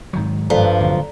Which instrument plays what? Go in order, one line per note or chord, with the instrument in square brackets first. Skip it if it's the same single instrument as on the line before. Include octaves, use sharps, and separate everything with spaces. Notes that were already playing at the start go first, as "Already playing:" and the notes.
[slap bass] G#2 D#3 F#3
[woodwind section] G2 [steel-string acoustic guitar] F3 [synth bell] A4 D5 A#5
[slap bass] D1 G1 F#3